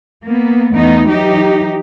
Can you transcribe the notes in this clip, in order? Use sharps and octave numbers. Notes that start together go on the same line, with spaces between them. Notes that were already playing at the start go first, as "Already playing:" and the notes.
A#3 B3
E2 A3 B3 D#4
E3 F#3 D#4 G4